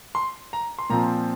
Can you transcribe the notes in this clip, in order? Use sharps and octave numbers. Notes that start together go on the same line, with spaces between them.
C6
A#5
C6
A#2 F3 C4 A#5